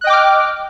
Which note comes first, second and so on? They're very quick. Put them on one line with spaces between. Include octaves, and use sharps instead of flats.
F#6 D#5 G5 D6 F6